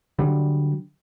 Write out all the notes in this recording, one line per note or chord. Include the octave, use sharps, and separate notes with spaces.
D3 F#3 G3